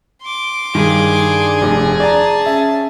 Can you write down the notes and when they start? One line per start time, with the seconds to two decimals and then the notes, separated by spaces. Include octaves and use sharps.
0.23 C6 D6
0.75 G2 D#3 G#4
1.16 D4
1.61 F1
2.00 D5 A5 A#5
2.46 C#4 E5